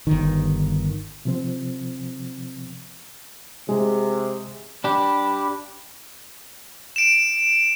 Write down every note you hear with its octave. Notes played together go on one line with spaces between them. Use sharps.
G1 D#3
C3 F3 C4
C3 G#3
D4 G4 B5
D7 E7